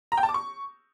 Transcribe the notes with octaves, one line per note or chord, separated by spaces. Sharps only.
A#5
G5
A5
D6
C#6